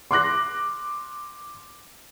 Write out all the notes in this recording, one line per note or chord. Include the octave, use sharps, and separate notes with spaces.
C6 D6 F#6 A#6